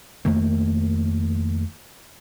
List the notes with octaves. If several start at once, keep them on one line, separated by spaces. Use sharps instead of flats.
F2 D#3 A3 A#3